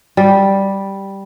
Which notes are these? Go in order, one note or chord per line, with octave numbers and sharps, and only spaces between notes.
G3